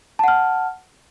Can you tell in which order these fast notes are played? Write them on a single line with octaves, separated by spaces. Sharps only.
A5 F#5 F6